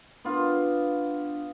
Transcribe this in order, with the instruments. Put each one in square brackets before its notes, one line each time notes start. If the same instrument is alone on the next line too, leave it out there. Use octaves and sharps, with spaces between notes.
[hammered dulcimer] B3 F4 [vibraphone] D4